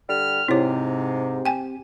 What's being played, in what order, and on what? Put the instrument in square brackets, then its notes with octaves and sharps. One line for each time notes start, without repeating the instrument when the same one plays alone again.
[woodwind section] D3 G3 F6
[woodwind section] G#2 C3 [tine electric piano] C4 G4 [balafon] E4 C#5
[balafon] G5 G#5